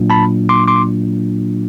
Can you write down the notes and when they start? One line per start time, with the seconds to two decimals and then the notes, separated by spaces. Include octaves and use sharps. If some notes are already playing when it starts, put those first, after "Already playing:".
Already playing: A#2 F#3 A#3 D4 F4
0.10 A5 B5
0.49 C6 D6
0.68 C6 D6